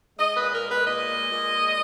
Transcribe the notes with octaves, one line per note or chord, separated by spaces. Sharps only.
G#3 D#5
A#2 B4
A#4
G#3
B4
A#2 D#5
G#3
A#2
G#3